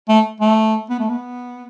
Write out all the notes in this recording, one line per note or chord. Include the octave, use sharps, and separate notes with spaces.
A3
A3
B3
A3
B3